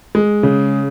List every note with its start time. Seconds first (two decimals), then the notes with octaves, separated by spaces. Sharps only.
0.15 G#3
0.43 C#3